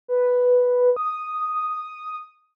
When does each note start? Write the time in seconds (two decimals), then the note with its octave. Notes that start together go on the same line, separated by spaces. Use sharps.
0.08 B4
0.96 D#6